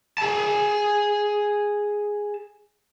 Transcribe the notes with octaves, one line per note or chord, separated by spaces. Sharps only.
G#4 A5